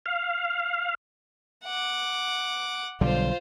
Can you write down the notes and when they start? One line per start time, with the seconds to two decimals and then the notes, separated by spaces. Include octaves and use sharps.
0.06 F5
1.65 F#5 D6
3.01 B1 D3 G3 F4 C5